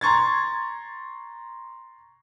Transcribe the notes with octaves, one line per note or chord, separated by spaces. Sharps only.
A#5 C6 C#6 G#6 A6